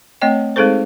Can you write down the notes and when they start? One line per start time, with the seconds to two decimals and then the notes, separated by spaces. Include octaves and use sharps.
0.22 A3 C4 C#5 D#5 G5
0.56 G#3 C4 D#4 G#4 A4 C5